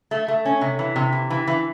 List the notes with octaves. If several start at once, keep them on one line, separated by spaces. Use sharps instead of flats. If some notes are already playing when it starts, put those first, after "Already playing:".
A3
A3
C#4
C3
E3
C3
E3
E3
E3